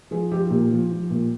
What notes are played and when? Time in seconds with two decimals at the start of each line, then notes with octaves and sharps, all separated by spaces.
0.11 F3 G#4
0.32 F3 G4
0.47 A#2 G4
0.71 F3
0.92 F3
1.10 A#2